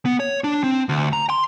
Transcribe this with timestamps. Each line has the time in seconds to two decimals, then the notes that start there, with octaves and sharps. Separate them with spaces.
0.06 B3
0.20 C#5
0.44 D4
0.64 C4
0.89 D2
1.13 A#5
1.30 C6